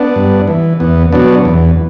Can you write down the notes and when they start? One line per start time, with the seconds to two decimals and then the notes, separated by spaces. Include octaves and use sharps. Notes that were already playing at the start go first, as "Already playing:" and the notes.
Already playing: B3 D4
0.16 G2
0.47 E3
0.80 E2 B3
1.12 B2 F#3 B3 D4
1.45 E2